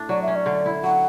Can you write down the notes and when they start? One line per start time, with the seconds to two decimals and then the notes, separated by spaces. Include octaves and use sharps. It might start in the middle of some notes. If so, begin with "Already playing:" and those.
Already playing: A2 D4
0.09 F#3 D5
0.22 E5
0.28 C#4
0.36 D5
0.46 D3
0.66 E4
0.84 F#3 F#5